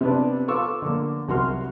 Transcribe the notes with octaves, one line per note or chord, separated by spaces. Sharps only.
C3 B3 D4
F4 A4 F5 C#6 D6 E6
D3 A#3
C2 F#3 F#4 A#4 C6 F6